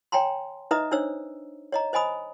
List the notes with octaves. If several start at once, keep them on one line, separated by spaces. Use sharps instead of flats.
C#5 G5 G#5 A#5 C6
D#4 B4 D#5 E5 A#5 D#6
D4 D#4 C5 C#5 E6
C#5 D#5 A#5
C5 D#5 G#5 B5 D#6